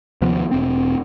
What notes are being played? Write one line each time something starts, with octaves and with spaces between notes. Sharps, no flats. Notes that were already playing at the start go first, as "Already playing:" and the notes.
D#2 C3 F3 B3
E1 C4